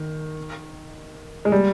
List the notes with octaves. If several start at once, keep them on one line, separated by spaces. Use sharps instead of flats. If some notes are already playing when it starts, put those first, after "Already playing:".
Already playing: D#3
G#3
G3